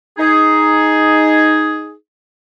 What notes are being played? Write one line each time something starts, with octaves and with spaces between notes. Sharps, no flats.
D#4 G#4